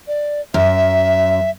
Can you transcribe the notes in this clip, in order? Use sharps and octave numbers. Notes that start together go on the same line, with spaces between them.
D5
F#2 E5